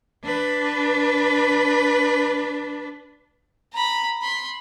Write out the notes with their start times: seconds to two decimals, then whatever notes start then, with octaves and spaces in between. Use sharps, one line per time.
0.24 D4 B4
3.73 A#5 B5
4.22 B5 C6